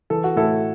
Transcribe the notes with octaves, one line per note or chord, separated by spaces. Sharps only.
E3 A4
F#4
A2 E4 A4